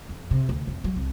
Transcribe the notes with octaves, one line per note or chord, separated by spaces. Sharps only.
F2
C3
D2
F2
F#3
C2